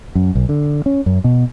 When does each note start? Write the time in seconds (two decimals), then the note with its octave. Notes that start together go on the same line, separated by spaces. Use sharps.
0.15 F#2
0.35 B1
0.49 D3
0.86 C#4
1.06 F#2
1.24 B2